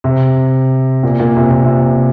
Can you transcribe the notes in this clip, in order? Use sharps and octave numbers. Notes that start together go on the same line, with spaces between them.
C3
A#2
A#2
C3
A#2
C3